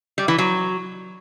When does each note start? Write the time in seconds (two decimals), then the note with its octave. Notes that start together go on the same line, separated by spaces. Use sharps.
0.18 G3
0.28 E3
0.38 F#3